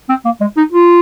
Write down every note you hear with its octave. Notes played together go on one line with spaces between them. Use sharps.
C4
A#3
G#3
D#4
F4